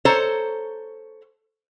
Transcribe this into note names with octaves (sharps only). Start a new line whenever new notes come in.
A4 C5 C#5 A#5